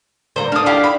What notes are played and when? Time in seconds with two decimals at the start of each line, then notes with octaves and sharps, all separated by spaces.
0.36 D3 G3 A#3 C5 A#5
0.52 D3 D4 F5 D#6
0.66 E4 F4 G4
0.84 B5